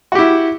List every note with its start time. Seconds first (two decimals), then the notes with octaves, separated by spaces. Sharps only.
0.12 F#4
0.15 G4
0.19 E4